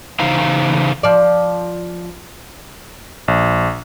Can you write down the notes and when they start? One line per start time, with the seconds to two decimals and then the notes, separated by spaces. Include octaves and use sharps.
0.19 C#3 E3 D#4 C5 F5 A#5
1.03 F3 D5
3.28 A#1